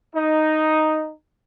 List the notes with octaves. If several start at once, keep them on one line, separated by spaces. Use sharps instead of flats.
D#4